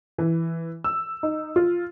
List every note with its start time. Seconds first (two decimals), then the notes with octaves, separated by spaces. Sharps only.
0.18 E3
0.84 E6
1.23 D#4
1.56 F4